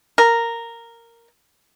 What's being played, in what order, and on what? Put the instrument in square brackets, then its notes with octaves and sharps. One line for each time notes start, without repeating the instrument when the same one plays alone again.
[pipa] A#4